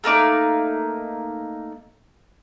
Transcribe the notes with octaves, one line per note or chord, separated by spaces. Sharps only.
A3 A#3 D#4 D6